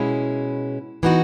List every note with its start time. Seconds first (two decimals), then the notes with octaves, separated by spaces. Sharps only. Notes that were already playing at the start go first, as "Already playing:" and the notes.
Already playing: B2 G#3 C#4 E4
1.03 E3 B3 D#4 F#4